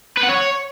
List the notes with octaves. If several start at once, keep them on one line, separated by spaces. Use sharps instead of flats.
B4
F#5
C#5